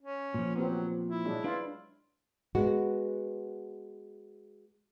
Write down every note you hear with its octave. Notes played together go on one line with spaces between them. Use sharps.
C#4
A#2 F3
F#3 B3 C4 G4
E4
F#3 G#3 D4
D4 F4 B4
G#3 B3 F#4